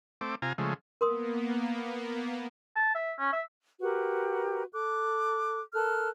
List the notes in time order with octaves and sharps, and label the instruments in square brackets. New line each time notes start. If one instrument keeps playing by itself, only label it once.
[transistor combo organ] A3 C4 D6
C3 F4 G#5 A#5
C#3 F3 G#3 A3
[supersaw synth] A#3 B3 [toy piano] A#4 C6 D#6
[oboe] A5
E5
C#4
E5
[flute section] F#4 G4 A#4 B4
A4 D6 F#6
A4 A#4 F6 F#6